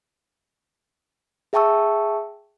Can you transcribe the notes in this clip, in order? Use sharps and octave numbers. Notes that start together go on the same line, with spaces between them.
G#4 E5 G5 A5 C#6 E6